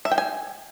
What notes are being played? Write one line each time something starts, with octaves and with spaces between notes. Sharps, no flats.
E5
G5
G#5